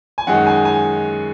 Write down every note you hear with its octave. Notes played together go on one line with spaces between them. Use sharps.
G#5
F#2 D#3 G#3 F#5
G#5
G#5